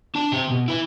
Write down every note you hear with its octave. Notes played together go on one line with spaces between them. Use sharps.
D4 A5
C3 G4
B2
E4 B4